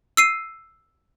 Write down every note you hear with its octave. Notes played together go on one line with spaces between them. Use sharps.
E6 C7 D#7